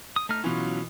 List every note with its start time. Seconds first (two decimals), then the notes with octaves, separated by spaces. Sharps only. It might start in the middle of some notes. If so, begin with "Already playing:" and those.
0.16 D#6
0.29 A3 D#4 F6
0.44 B2 E3 F#3 C#4 F4